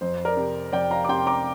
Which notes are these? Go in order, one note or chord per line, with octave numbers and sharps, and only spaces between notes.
F2 C5
A#4 D5
C3
F2 D5 G5
F5 A#5
D6
C3 G5 C6
A#5 D6